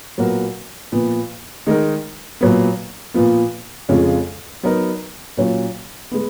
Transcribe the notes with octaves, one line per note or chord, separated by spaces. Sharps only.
A#2 F#3 B3 F#4 A#4
A#2 F3 B3
D#3 G#3 D#4 A#4
A#2 F#3 B3
A#2 F3 B3
F2 C#3 G#3 C#4 F4
F#3 B3 D#4 A#4
A#2 F#3 C#4 F4
G#3 B3